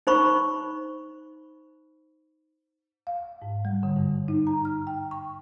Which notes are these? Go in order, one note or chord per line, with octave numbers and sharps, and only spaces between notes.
D#4 C5 B5 C#6
F5
G#2
G3
D3
G2
D#4
A#5
F6
G5
C#6